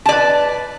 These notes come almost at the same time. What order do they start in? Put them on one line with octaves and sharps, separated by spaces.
A5 D5 B4